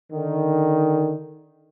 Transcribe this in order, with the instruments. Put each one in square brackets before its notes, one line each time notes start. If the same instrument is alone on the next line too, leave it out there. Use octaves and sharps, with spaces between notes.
[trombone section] D3 D#3